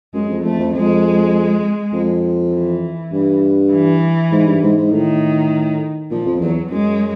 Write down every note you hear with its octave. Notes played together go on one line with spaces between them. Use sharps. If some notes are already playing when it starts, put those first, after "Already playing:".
F#2 G#3
F2
F2 A3
F2
F2 G#3
F2
E3
G2
E3
G#2
G2
G#2
G#2
A2 D#3
A#2 F3
F2
E2 F#3
F#2 G#3